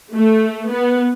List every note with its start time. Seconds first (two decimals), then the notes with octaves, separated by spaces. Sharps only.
0.15 A3
0.71 B3